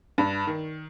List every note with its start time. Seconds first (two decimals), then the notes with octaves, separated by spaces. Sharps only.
0.18 G2
0.47 D#3